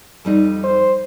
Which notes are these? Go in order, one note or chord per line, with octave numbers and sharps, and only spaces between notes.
F2 G3 D#4
C5